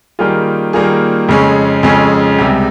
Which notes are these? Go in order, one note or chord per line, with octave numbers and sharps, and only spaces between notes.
D#3 G3 A#3 F4 G#4
D#3 G3 A#3 F4 G#4
F2 C#3 G#3 C#4 G#4
F2 C#3 G#3 C#4 G#4
C#2 C3 G3